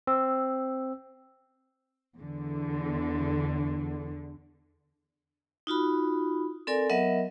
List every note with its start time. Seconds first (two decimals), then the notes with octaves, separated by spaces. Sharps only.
0.07 C4 E6
2.17 E2 D3
5.67 D#4 F4 F#4 B5
6.67 C4 A4 A#4 D5 G#5
6.89 F#3 B3 A#4 D#5 E5 F#5